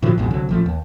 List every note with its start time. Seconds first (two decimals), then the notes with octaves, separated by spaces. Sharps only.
0.02 A2 D3 F3 F#3
0.18 A#1 E2 G#2 B2
0.31 C2 D3 F#3
0.49 A1 F3 A3
0.66 D#2